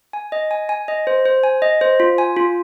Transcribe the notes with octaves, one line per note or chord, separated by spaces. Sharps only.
G#5
D#5
G#5
G#5
D#5
C5
C5
G#5
D#5
C5
F4
G#5
F4